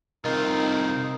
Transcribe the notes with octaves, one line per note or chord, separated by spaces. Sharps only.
C2 D#3 C4 D#4 F4 A#4